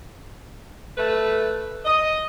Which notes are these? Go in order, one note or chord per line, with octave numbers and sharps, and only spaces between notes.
A3 B4
D#5